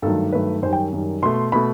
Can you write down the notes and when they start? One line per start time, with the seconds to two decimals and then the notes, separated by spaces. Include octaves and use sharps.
0.02 G2 D#3 F#3 A3 A4
0.32 G2 D#3 F#3 A3 B4
0.62 F#2 D#3 G3 C5
0.73 G5
0.93 F#2 D#3 G3
1.22 B2 A3 C6
1.52 B2 A3 B5